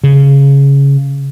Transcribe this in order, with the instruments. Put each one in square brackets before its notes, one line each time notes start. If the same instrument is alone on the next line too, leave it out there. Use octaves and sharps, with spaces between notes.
[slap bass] C#3